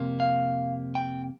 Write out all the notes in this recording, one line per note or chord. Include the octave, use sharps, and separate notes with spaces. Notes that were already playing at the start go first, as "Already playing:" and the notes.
Already playing: F2 C3 A#3
F5
G5